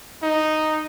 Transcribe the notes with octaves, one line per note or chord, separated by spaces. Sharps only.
D#4